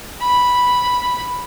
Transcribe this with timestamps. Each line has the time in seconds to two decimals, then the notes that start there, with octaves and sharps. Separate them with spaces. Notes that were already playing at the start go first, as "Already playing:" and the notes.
0.21 B5